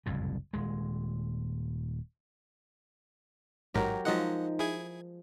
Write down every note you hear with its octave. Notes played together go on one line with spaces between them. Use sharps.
F#1 C2 F2 A2
D#1 G#3
A1 G#2 F#3 G4 A#4
F3 F#3 G#3 D#4 D#5 F#5
E4 G#4 G#6